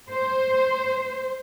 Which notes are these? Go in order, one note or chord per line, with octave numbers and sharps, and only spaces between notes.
C5